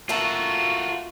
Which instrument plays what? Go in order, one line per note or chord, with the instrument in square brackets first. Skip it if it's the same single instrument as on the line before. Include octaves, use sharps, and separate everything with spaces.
[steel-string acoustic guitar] A3 A#3 A4 [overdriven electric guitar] F4 F#4